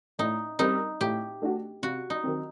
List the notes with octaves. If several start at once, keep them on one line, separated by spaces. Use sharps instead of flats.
A2 D#4
G3 C4 D#4 G4 A#4
A2 G4
A3 D4 F#4
C3 F#4
D#4
D#3 F#3 C4